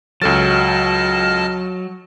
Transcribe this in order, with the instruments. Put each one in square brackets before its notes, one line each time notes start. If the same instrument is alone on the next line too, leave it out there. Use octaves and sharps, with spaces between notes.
[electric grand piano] C#2 A4 A6 [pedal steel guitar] F#3 [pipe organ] D#5 A5 F6